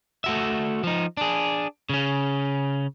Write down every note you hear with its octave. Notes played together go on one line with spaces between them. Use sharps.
A3 F#4 E5
F3 D#4
D4 G#4
C#3 C#4